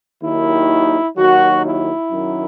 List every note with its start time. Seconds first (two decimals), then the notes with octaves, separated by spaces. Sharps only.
0.22 D#2 D#3 F#3 E4
1.16 D#2 D#3 F#3 F#4
1.64 E4
2.11 F#2 D#3 F#3